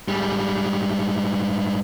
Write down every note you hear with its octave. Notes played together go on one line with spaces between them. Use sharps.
G#2 G3